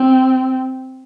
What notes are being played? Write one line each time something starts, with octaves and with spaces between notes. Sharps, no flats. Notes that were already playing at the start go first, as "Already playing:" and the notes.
Already playing: C4